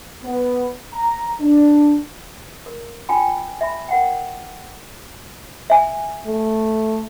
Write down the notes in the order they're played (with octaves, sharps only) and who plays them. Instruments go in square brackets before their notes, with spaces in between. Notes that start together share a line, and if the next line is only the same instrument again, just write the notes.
[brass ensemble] B3
A#5
D4
[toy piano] A#4
F4 G5 G#5 B5
E5 B5
A#4 F#5 G5
E5 G#5
[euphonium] A3